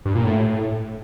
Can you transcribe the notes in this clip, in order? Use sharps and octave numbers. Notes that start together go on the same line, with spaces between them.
G2
A#2
A2